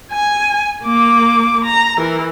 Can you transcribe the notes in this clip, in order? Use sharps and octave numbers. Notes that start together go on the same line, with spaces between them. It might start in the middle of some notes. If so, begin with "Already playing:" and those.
G#5
A#3 D6
A#5
E3 A#4